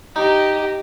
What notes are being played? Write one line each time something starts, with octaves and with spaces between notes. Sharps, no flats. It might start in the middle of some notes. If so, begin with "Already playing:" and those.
D#4 G4 D#5